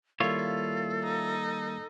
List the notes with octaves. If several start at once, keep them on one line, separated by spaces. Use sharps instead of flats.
D#3 G3 A#3 E4 F4 A4 C#5
D#4